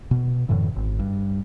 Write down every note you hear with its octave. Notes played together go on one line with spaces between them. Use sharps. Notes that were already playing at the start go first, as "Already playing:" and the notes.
B2
F#2 A2 D3 E3
G#1
G2